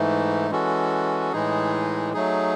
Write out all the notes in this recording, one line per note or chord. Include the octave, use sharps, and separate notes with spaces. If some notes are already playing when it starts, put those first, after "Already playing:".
Already playing: G#2 E3 A3 D#4
E3 G#3 C#4 F#4 A4
A2 E3 G#3 D#4 G#4
F#3 A3 D#4 G#4